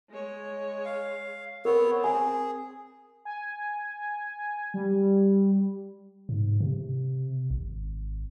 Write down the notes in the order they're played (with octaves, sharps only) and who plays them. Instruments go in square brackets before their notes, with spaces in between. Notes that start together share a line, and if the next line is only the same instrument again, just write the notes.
[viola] G#3 C#5
[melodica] F5
[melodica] B3 C#5 [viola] C4 [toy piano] A#4
[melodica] G#4 [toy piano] G#5
[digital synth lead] G#5
G3
[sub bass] G#2
C3
G#1